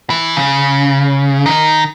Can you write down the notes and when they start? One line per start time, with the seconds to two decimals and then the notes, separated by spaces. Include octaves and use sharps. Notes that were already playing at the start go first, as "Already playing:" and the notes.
0.10 E3
0.37 C#3
1.46 D#3